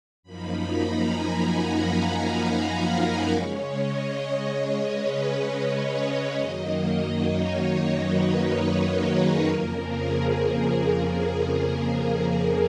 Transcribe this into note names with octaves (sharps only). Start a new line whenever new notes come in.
F#2 F3 A#3 D#4 B5
A#5
G#5
F#5
F5
A#4
C#3 G#3 C#4 C#5
D#5
C#5
B4
C#5
D#5
F#2 D#3 F#3 A#3 D#4 D#5
C#5
B4
A#4
G#4
F2 C#3 F3 A#3 A#4
G#4
A#4
G#4